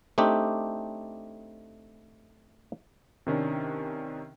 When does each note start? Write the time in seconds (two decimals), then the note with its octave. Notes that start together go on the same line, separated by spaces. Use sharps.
0.18 A3 C4 D4 D#4 G4
3.27 C3 D#3 C#4 D4